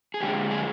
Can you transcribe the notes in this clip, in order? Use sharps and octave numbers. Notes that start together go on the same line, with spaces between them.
G#4
F2 D3 G#3 G4
G#4